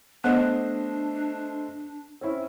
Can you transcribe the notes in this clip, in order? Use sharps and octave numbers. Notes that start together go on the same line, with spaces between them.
A3 B3 D4 C5 D#5
C4 C#4 E4